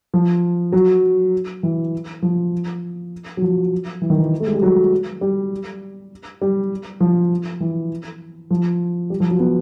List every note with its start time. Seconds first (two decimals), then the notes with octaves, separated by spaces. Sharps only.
0.14 F3
0.72 F#3
1.63 E3
2.22 F3
3.37 F#3
3.42 F3
4.02 E3
4.10 D#3
4.18 E3
4.40 A3
4.47 G#3
4.54 G3
4.62 F#3
5.21 G3
6.41 G3
7.00 F3
7.60 E3
8.50 F3
9.10 G3
9.20 F3
9.30 F#3
9.39 B3